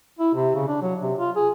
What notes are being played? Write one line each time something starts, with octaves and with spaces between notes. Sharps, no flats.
E4
C3
C#3
D4
F#3
C3
F4
G#4